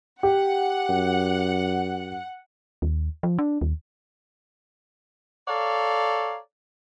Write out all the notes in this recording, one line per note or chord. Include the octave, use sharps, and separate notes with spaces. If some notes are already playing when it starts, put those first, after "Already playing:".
G4 F#5
F#2
D#2
F3
D4
D#2
A4 C#5 D5 F5 A#5